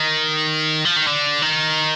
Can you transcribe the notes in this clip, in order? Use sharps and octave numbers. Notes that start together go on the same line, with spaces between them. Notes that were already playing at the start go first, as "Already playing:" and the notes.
Already playing: D#3
F3
D#3
D3
D#3